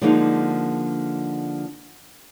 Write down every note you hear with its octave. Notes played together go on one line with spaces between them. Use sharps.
D3 F3 G#3 A#3 C4 D#4